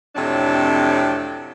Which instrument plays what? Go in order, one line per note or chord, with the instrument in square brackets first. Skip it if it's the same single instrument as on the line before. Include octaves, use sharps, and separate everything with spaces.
[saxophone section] F2 A2 C3 F#3 D4